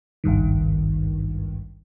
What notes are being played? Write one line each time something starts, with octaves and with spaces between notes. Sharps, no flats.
G#1 C#2 G2 D#3